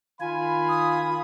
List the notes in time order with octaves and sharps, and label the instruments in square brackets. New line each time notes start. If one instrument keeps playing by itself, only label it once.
[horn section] D#3 F5 B5 [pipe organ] F4 G#5
[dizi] D#6